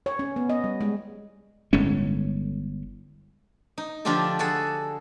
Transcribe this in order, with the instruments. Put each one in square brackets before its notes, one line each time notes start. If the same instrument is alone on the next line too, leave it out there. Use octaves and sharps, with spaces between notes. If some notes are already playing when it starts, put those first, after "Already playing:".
[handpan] C#5
C#4
B3
D#5
G3
G#3
[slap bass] G1 A2 G#3 C#4
[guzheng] D#4
D3 F3 D4 F4 G4 A4
F#4 G#4 A4